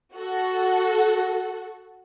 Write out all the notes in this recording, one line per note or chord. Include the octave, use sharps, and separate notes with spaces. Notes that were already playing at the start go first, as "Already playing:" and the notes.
F#4 A4